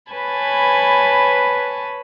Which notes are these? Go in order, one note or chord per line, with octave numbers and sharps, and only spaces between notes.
B4 C#5 G#5 A5 B5